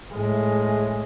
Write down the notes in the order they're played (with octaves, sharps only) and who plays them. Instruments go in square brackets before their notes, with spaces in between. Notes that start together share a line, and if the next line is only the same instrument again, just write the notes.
[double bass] A2 G#3